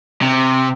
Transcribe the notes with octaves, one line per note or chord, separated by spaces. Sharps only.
C3